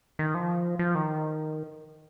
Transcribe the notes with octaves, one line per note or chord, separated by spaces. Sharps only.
D#3
F3
F3
D#3